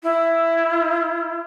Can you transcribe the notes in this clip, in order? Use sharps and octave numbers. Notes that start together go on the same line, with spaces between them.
E4